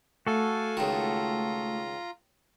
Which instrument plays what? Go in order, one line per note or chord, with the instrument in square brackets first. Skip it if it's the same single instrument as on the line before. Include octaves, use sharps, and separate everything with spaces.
[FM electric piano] A3 [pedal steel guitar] F#4 A4 [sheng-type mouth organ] F5 G#5
[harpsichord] C#2 D#3 [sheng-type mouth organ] F4 A#5